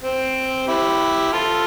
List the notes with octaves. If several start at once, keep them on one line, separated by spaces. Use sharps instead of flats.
C4
E4 G4
F4 A4